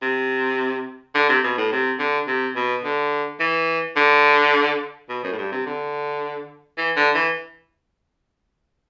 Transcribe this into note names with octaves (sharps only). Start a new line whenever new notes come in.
C3
D3
C3
B2
A2
C3
D3
C3
B2
D3
E3
D3
B2
F#2
A2
G2
C3
D3
E3
D3
E3